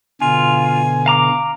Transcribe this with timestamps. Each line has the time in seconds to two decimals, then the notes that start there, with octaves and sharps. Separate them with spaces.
0.21 B2 D3 F4 G#5
1.06 F5 A#5 D6